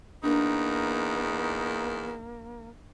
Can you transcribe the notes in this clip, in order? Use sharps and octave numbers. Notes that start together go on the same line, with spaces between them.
E2 A#3 D4 D#4